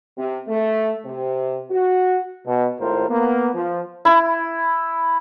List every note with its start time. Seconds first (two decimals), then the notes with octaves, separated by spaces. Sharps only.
0.16 C3
0.47 A3
1.04 C3
1.70 F#4
2.46 B2
2.80 G#1 A2 F4 A#4 C5
3.09 A#3 B3
3.54 F3
4.05 E4